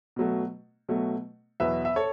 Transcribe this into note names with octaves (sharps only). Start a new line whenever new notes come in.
B2 F#3 A3
B2 F#3 A3
E2 B2 F#3 B4 E5
E5
A4 C#5